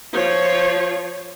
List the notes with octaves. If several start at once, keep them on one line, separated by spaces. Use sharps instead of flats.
F3 C#5